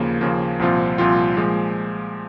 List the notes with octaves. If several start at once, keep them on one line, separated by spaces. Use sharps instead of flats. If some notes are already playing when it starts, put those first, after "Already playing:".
Already playing: D#2 C#3 F3 A#3
D#2 C#3 F3 A#3
C2 A#2 F3 C4 F4
C2 A#2 F3 C4 F4
A#2 F3 G#3